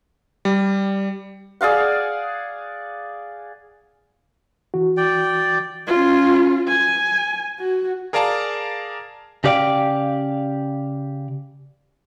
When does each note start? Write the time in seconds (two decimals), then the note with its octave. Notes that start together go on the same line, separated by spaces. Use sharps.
0.45 G3
1.61 G#4 D5 F5 F#5
4.74 E3 F#4
4.97 D5 G5
5.87 C#4 F4
6.68 G#5
7.60 F#4
8.13 G#4 A#4 D5 F5 A5 A#5
9.44 C#3 G4 D5 F5 G5